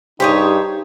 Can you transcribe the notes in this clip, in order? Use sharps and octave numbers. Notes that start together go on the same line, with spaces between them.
G2 D#4 G4 G#4 C5 C#5